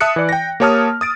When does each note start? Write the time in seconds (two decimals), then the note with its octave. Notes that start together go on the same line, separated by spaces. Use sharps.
0.01 E5 A5 D#6 F#6 C#7
0.16 E3 D5
0.29 G5 A#6
0.60 A#3 G4 C#5 A5 D#6 F6
1.01 D#6 A6 D7